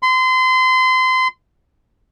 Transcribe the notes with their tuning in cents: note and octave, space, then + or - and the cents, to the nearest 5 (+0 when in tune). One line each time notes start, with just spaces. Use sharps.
C6 -30